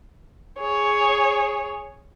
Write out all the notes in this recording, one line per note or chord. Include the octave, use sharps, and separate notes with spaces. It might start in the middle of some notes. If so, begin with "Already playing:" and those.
G#4 C#5